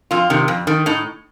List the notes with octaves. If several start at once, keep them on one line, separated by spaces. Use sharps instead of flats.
F2 F4
C3 D#3
F2
D#3
A2 D#4